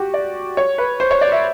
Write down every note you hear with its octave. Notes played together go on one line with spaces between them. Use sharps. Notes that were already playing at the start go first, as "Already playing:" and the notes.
Already playing: F#4 G4
D5
C#5
B4
C5
C#5
D5
E5